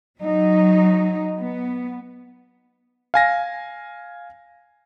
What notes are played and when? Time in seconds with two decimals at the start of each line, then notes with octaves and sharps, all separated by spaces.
0.18 F#3 D#4
1.38 B3
3.14 F5 G#5 A#6